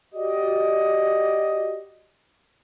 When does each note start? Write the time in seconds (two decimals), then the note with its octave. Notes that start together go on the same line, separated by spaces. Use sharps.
0.14 F#4 G4 D5 D#5